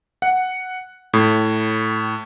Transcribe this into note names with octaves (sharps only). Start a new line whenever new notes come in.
F#5
A2